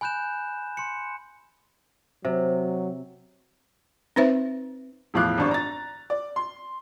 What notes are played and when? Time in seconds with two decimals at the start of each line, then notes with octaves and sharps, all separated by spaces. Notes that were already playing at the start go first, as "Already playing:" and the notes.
0.01 G#5 B5 F#6 G6 E7
0.77 C6 C#7
2.25 C3 F#3
4.16 C4 D#4 B4 C5 E5
5.14 E1 A2 F3 F5 D6 F#6
5.38 G#1 G2 D4 D5 C#6
5.51 A#5 A6
6.10 D5
6.36 C6